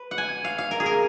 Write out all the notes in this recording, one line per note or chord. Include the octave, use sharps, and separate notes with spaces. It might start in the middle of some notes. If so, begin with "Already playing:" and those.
Already playing: B4
F#5
G#5
F5
F5
A#4
G#4
A#4